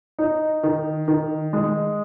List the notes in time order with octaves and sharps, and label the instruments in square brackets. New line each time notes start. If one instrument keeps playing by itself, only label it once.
[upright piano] D#4
D#3
D#3
G#3